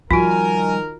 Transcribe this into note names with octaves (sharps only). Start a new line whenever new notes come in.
D#3 F3 G3 F4 F#4 A#4 G#5